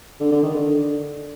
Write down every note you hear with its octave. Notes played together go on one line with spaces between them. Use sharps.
D3
D3
D#3
D3